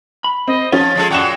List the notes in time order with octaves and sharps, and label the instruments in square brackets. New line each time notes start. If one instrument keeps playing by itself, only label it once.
[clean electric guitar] B5
[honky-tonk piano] C4 [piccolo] D#5
[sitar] F3 [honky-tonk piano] C#4 [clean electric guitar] F4 [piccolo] A6
[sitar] F3 G#3 A4
[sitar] F#2 A#2 F#3 [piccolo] F#5 [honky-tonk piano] G5 E7